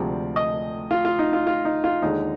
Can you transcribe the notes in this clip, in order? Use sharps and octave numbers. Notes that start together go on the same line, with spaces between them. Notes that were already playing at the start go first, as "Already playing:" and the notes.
Already playing: D2 C3 F3 G#3 D5
D#5
F4
F4
D#4
F4
F4
D#4
F4
D#2 D3 G#3 D#4